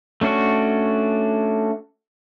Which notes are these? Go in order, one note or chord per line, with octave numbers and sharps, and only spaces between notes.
A3 C#4 D4 F#4